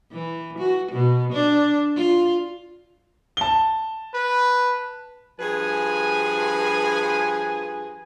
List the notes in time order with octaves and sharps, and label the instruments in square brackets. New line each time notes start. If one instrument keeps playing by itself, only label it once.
[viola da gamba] E3
F#4
B2
D4
F4
[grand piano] A5 G7
[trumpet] B4
[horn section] G2 F3 G#4 B4 G#5